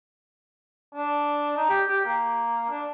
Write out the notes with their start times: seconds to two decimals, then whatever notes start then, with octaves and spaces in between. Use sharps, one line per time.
0.95 D4
1.56 D#4
1.69 G4
1.89 G4
2.05 A#3
2.70 D4